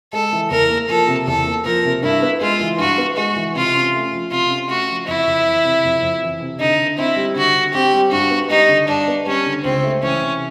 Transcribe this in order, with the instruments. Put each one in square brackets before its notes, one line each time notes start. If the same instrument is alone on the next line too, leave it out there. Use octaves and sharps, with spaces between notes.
[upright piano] G#3 [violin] A4
[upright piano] E3
[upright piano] E2 [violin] A#4
[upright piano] A#3
[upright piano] F3 [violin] A4
[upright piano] C3
[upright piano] E2 [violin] A4
[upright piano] A#3
[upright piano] F3 [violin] A#4
[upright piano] C3
[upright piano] G2 [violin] E4
[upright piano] B3
[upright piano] G#3 [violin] F4
[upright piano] E3
[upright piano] G2 [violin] F#4
[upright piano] B3
[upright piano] G#3 [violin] F#4
[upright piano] E3
[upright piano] C3 [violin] F4
[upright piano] C#4
A3
F3
[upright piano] C3 [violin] F4
[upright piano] C#4
[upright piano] A3 [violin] F#4
[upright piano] F3
[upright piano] F2 [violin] E4
[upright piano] F2
E3
C3
F2
F2
E3
C3
[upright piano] D3 [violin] D#4
[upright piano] D3
[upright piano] C4 [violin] E4
[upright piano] G3
[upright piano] D3 [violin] F#4
[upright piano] D3
[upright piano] C4 [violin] G4
[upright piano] G3
[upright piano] G2 [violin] F#4
[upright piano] B3
[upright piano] G3 [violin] D#4
[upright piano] D3
[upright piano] G2 [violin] D4
[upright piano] B3
[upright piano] G3 [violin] C#4
[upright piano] D3
[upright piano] C#2 [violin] C4
[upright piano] A3
[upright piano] E3 [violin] C#4
[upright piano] C3